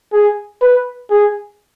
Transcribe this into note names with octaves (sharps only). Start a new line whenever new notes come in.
G#4
B4
G#4